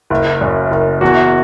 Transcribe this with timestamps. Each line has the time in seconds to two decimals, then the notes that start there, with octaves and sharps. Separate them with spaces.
0.10 F#1
0.41 F#2
0.71 F#1
1.01 E2 F#4